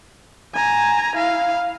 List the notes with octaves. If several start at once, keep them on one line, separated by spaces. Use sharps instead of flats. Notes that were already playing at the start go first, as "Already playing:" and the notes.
G#5 A#5
E4 F5